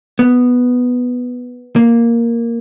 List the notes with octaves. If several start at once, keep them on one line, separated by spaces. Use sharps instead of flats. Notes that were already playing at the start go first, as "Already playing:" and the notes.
B3
A#3